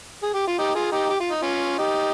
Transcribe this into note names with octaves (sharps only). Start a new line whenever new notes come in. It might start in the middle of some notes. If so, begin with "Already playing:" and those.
G#4
G4
F4
D#4 G4
F4 G#4
D#4 G4
G4
F4
D#4
C#4 F4
D#4 G4